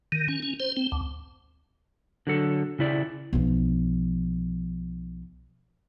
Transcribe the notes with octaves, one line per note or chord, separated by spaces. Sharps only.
D#3
C#4
C#4
C5
C4
D2
D3 F#3 A4
C#3 E4 D5
B1 F3